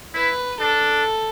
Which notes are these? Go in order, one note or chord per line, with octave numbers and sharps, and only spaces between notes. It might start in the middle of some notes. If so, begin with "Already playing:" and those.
E4 B4
D4 A4